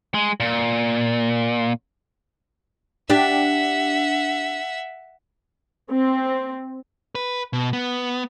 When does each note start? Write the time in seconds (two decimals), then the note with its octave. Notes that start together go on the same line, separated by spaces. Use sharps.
0.15 G#3
0.40 A#2
3.10 D4 G4 E5 F#5
5.90 C4
7.15 B4
7.53 B2
7.73 B3